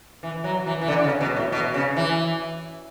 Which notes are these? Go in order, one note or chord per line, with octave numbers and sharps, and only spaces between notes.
E3
F#3
E3
E3
D3
C#3
B2
A2
B2
C#3
E3